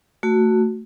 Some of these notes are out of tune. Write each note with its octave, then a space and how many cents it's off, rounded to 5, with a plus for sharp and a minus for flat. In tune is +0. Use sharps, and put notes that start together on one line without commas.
A3 +15 F#4 +0